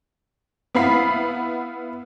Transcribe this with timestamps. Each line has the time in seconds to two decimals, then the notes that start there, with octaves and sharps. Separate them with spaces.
0.75 B3 E4 F5 B5 C7